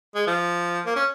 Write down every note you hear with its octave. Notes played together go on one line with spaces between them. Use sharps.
G#3
F3
A#3
C#4